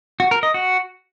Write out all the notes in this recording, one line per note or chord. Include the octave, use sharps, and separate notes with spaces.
F#4
A#4
D#5
F#4